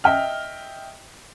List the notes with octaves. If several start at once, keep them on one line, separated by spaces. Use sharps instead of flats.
D#5 E5 G5 F6